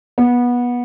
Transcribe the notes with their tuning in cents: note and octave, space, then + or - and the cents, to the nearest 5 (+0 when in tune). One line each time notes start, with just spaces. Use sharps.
B3 -20